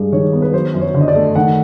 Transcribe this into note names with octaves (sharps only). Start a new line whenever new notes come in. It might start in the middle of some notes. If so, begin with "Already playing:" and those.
Already playing: G2 G#3
D#3 C#5
B3
B4
F#3 C5
F#2
C#5
D3
D#5
D5
A3
D#3 F#5